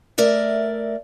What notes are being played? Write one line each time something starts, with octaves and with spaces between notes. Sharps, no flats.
A3 A#4 D5 E5